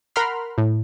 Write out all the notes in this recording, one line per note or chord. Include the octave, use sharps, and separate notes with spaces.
A#4 F#5 B5 C6 F6
A2